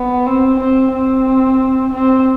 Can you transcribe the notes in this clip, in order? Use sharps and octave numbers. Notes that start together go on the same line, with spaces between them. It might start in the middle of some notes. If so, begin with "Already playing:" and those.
Already playing: B3
C4
C4
C4
C4